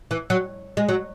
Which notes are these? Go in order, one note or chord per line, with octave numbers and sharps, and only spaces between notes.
E3
F#3
G#3
F#3